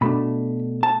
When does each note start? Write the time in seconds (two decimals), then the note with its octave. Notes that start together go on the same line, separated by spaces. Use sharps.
0.01 B2 A3 D4 B5
0.83 A5